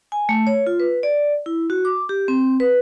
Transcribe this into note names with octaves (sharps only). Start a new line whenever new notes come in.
G#5
A3
C#5
F4
B4
D5
E4
F#4
D6
G4
C4
B4